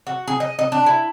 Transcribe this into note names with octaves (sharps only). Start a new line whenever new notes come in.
F#4
G#4
D#5
D#5
D4
E4